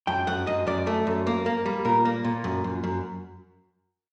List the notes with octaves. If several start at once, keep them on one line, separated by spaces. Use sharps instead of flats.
F#2 G5
F#2 F#5
F#2 D#5
F#2 D5
A3
F#2
A#3
A#3
G3
A#2 A#4
A#3
A#2
F#2
F#2
F#2